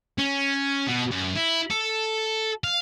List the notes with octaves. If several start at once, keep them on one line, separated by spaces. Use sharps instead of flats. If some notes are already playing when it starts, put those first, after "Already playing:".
C#4
B2
F#2
E4
A4
F5